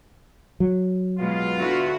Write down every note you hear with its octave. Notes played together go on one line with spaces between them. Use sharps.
F#3
B2 G#3 B3 F4
D3 E4 F#4